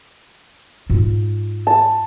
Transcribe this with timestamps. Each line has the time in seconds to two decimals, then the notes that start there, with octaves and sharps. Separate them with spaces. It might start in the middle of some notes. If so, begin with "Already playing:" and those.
0.90 G#2 F4
1.67 A5